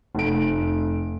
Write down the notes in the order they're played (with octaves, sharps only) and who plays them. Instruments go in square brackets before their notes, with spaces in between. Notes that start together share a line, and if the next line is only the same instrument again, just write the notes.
[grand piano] F1 D7